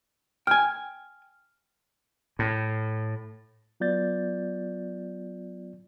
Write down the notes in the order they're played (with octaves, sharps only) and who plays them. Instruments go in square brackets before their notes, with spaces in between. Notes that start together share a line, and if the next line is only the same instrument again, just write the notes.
[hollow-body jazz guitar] G5 G#5 [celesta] F6
[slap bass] A2
[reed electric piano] F#3 B3 F4 D5 G6 A6